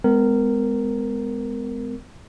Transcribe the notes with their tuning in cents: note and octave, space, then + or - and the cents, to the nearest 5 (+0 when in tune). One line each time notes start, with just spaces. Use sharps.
G#3 +0 B3 +40 A#4 -10